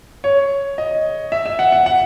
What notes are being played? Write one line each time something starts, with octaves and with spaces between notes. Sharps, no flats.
C#5
D#5
E5
E5
F#5
F#5
F#5